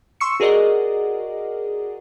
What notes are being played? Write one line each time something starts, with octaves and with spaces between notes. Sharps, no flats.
C6 C#6 E6 C#7
F#4 G#4 A#4 D5 D#5 F#5